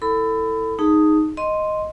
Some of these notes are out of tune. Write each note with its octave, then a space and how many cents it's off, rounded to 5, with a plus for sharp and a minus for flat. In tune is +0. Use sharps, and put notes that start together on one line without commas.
E4 +0 A4 +20 B5 +25
D#4 +0 G#4 +0 A5 +20
D#5 +0 C6 +0